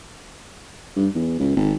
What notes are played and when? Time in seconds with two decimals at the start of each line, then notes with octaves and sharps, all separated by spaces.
0.96 G2
1.15 E2
1.39 C#2
1.56 G#1